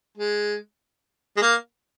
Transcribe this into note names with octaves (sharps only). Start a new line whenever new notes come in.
G#3
G#3
A#3